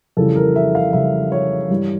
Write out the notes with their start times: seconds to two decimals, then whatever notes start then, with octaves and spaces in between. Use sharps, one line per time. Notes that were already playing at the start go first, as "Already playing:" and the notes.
0.17 F2 C#3 E3 G3 A4
0.36 A#4
0.56 E5
0.75 F5
0.93 F2 C#3 E3 G3 E5
1.32 C#5
1.70 G2 E3 G3